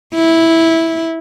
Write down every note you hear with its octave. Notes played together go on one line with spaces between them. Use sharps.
E4